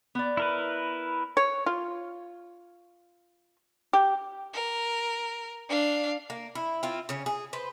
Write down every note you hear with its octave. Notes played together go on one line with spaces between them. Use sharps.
B3 D5
E4 A#4 B4
C#5
F4
G4
A#4
D4 F5
A#3
E4
C4 E4 F4
C#3 C#4
G#4
B4 C5